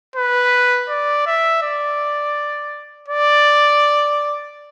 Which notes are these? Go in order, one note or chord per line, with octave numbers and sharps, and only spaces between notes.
B4
D5
E5
D5
D5